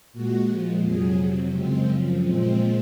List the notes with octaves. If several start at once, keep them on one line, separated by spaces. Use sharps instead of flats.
A#2 G#3 F#4
A#2 F3 G#3
F2 C3 F#3 G#4
F2 C3 F#3
F#2 C#3 G#3 C4
F#2 C#3 F3
A#2 F3 G#3 C4